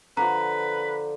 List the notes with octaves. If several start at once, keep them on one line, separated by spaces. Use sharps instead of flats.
D3 F3 B4 A#5